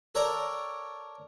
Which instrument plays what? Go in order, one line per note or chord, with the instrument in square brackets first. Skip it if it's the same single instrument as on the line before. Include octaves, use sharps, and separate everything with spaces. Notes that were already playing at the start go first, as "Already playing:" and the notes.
[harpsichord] A4 A#4 C#5 D5 G5 A#5